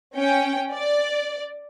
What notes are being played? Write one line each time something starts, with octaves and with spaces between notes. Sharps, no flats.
C#4 G5
D5